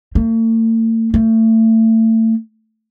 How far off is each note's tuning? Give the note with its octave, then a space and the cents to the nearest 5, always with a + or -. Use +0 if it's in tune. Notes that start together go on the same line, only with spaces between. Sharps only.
A3 +45
A3 +30